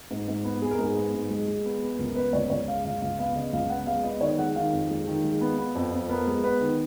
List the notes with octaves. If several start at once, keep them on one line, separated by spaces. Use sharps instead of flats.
G#2
G#2
B3
B3 G#4
A#4
G#2 G#4
B3
G#2
G#3
G#3
B3
B3
C#2 A#4
B3 B4
C#2 C#5
C#2 C#5
G#3 F5
C#2 F5
C#2 F5
B3 F5
C#3 D#5
C#2 F5
B3 F#5
G#3 F5
B3 D#5
D#3 C#5
G#3 F#5
D#3 F5
F2
G#3
D#3
G#3
B3
B3
F2
F2
B3 A#4
G#3
B3 B4
D#3